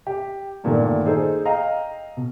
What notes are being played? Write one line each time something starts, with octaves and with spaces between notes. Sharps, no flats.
G4
G2 A#2 D3 D#3 A3 B3
D#4 G#4 A4 C5
D#5 F5 G5 A#5
B2